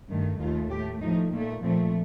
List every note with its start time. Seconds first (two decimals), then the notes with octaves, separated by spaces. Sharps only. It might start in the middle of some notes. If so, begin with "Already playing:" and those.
0.10 G2 D#3 A3
0.40 D#2 D#3 A3 F4
0.71 A2 A3 G4
1.01 A2 F3 A3 D#4
1.32 A#2 A3 A#3
1.63 A#2 F3 A3 C4